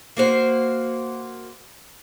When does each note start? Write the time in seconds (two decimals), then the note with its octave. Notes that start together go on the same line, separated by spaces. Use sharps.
0.17 A#3 F#4 C5